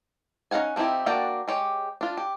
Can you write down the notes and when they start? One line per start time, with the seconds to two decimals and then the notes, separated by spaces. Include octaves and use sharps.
0.51 C#4 D#4 F5 F#5 G#5
0.76 F3 C4 D#4 E4 G4
1.06 A#3 D4 F#4 D5 G5
1.48 G#3 G4 C#5
2.01 D4 F4
2.17 G4